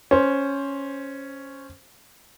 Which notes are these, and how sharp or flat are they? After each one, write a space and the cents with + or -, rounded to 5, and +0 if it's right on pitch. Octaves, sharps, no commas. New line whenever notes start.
C#4 +0 C5 +10